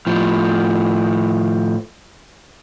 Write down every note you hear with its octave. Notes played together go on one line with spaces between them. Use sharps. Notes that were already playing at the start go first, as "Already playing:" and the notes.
A2 F3